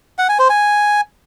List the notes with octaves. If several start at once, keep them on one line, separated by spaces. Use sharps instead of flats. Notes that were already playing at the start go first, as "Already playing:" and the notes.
F#5
G#5
C5
G#5